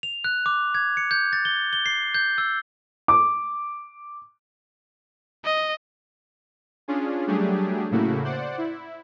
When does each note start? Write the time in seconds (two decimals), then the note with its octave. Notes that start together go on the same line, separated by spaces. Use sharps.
0.03 F7
0.24 F#6
0.46 D6
0.75 G#6
0.97 C#7
1.11 G6
1.33 A6
1.45 G7
1.73 G7
1.86 C7
2.14 G6
2.38 E6
3.08 D6
5.45 D#5
6.88 C#4 D4 F4 G#4
7.27 F#3 G3 A3 D4 G4 G#4
7.91 A2 C#3 A3 A#3 E4 F#4
8.24 C5 D5 F#5
8.58 E4